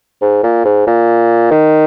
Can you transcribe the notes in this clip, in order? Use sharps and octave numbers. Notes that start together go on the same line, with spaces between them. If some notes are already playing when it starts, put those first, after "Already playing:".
G#2
A#2
G#2
A#2
D#3